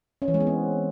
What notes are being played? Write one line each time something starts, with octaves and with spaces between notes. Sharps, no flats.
C#4
E3
G#3
B3
C4